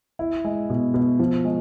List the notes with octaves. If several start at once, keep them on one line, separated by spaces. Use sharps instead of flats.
E4
G#3
B2
B2
F3
G#3